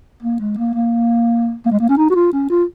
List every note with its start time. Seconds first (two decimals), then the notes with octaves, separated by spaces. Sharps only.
0.23 A#3
0.40 G#3
0.58 A#3
0.75 A#3
1.66 A#3
1.72 G#3
1.80 A#3
1.89 C#4
1.98 D#4
2.10 F#4
2.15 F4
2.33 C#4
2.50 F4